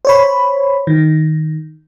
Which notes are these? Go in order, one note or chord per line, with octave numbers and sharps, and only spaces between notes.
C5 C#5 B5
D#3